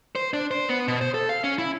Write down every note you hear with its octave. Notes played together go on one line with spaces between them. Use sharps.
C5
D4
C5
B3
B2
C5
A4
F5
C#4
E4